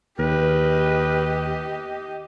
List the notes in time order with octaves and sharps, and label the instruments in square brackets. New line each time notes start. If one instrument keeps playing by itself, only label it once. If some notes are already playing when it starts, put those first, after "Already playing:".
[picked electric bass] D#2 [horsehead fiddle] G4 D#5 [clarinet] B4